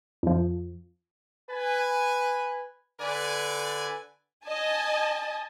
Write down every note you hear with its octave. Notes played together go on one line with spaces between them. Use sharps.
F2 F3
B4 G#5
D3 B4 D5 G#5
D#5 G#5 A5